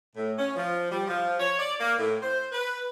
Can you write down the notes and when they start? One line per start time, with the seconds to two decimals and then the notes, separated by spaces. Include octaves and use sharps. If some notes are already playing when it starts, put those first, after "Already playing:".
0.16 A2
0.38 C#4
0.56 F3
0.91 G3
1.07 F3
1.40 C#5
1.59 D5
1.80 A#3
1.99 A2
2.22 C5
2.52 B4